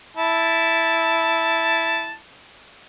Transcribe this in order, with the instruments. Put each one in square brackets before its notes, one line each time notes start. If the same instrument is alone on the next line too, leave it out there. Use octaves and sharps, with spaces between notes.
[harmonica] E4 A5